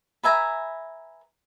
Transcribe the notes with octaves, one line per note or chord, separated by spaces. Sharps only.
B4 E5 G#5 A#5